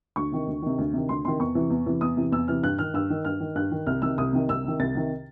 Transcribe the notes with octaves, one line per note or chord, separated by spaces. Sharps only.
D2 C#6
C3 D#3
D2
C3 D#3
D2
C3 D#3
D2 C6
C3 D#3 C6
E2 C#6
C3 E3
E2
C3 E3
E2 D#6
C3 E3
E2 E6
C3 E3 F6
G2 F#6
D#3 F6
G2 E6
D#3
G2 F6
D#3
G2 F#6
D#3
C2 F6
C3 D#3 E6
C2 D#6
C3 D#3
C2 E6
C3 D#3
C2 A6
C3 D#3